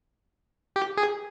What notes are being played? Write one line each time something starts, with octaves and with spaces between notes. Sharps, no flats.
G4
G#4